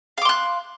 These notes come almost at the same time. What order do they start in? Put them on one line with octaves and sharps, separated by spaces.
F5 D6 C6 F#6